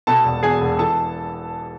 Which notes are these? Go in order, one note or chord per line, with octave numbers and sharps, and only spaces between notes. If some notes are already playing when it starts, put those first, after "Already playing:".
B2 A4 A5
E1
E2 G#4 G#5
E1
E3 A4 A5